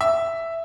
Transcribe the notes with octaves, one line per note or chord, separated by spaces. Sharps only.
E5